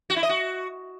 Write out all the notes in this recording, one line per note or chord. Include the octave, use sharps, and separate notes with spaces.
F#4
E4
D#5
F#4